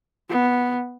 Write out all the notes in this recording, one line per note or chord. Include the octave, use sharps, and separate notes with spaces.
B3